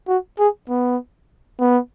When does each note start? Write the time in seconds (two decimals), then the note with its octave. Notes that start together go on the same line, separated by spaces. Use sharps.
0.08 F#4
0.39 G#4
0.69 B3
1.60 B3